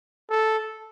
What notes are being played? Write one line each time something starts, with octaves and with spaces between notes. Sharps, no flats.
A4